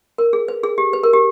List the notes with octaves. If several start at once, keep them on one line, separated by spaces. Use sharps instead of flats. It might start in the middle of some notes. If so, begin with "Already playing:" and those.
A#4
G#4
B4
G#4
G4
B4
A#4
G4